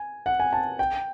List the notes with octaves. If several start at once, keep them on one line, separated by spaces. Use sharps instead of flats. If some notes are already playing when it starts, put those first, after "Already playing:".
Already playing: G#5
F#5
G#5
A5
G5